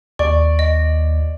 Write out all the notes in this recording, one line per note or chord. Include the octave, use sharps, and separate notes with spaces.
D#2 D5 C#6
D#5